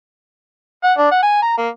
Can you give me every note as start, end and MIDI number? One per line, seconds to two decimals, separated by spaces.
0.84 0.93 78
0.98 1.09 62
1.11 1.20 78
1.23 1.40 80
1.42 1.55 82
1.58 1.68 58